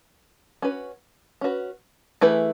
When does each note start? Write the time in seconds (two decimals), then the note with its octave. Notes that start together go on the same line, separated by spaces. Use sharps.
0.62 C#4 F#4 B4
1.41 C#4 F#4 B4
2.21 E3 A3 E4 G#4 B4